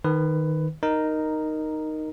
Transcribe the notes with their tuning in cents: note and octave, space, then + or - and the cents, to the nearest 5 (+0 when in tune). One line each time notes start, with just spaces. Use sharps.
D#3 +0 B4 +15
D#4 -5 A#4 +0